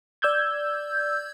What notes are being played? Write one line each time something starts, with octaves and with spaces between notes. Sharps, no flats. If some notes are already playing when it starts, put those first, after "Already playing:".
D5 E6 G6 G#6